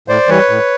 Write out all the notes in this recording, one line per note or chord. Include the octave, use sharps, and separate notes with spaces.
A2 C5 D5
E3 G3 B4 C#5
A2